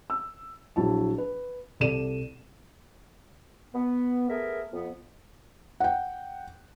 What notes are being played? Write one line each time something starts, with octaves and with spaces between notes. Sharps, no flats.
E6
A#1 F#3 E4 A5
B4
C2 A4 D5 D#7 E7
B3
A3 B3 G#4 A#4 E5
F2 B3
F#5 G5